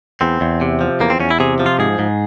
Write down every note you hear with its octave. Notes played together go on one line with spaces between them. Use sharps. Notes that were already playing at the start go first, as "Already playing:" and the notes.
E2 C4
E2
C3
F3
E2 A#3
C4
E2 C#4
E4
C3 G#4
F3
F4
G#2 G#4
G#2